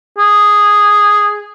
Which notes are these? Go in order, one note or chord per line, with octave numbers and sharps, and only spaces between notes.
G#4